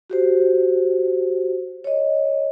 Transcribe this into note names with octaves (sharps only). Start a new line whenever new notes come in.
F#4 G4 C5
C#5 D#5